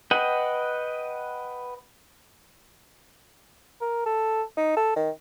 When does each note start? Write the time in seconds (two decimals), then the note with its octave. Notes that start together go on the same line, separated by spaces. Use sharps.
0.11 B4 D#5 F#5 G5
3.81 A#4
4.06 A4
4.57 D#4
4.76 A4
4.96 D#3